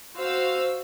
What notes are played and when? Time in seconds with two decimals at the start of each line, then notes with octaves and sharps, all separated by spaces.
0.17 F#4 C5 F5 E6